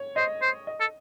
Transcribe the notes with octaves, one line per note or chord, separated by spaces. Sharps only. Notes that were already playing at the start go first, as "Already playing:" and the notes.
Already playing: C#5
C5 D#5
C5
D#5
A4